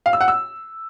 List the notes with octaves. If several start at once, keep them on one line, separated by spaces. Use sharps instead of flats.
F5
E6
F#5
E6